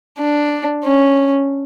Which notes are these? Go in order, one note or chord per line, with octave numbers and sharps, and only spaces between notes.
D4
C#4